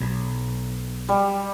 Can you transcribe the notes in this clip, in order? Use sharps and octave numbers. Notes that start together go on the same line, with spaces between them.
B1
G3